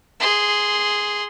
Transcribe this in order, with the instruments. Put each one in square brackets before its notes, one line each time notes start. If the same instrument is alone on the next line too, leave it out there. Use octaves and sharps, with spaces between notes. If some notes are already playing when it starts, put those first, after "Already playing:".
[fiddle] G#4 C6